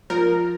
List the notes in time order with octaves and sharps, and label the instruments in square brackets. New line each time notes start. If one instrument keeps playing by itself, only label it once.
[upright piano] F3 [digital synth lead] A#4